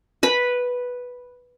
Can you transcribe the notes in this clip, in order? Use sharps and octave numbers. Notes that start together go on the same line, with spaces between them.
B4 B5